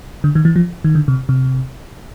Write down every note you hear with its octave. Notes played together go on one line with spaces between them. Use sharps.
D3
D#3
E3
F3
D#3
D3
C3
C3